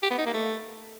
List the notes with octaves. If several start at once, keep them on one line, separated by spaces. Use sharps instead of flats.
G4
B3
D#4
A#3
A3